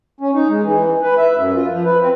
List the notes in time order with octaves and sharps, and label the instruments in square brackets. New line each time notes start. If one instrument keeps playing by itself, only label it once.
[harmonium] C#4
D#4
G#3
E3
B4
E5
F#2
F4
F3
B4
C4